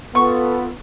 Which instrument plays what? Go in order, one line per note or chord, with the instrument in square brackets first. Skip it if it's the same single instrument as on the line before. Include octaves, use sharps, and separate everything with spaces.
[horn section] B3 [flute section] F4 A4 [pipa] C#6